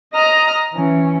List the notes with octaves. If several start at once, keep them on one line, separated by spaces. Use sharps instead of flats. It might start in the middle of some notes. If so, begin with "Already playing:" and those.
D#5 A#5 F6
E3 C#4